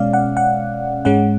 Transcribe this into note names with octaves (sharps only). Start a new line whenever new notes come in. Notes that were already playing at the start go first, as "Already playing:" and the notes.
Already playing: B2 G#3 C#4 D5 F5
F#5
F#5
G#2 G#3 C#4 F#5